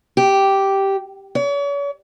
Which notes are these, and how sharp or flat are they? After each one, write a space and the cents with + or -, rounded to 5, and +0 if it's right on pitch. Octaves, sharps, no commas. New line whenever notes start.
G4 -5
C#5 +40